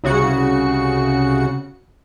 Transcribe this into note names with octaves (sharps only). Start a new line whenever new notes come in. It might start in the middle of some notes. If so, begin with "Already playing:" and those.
C2 C#3 F#4 C#7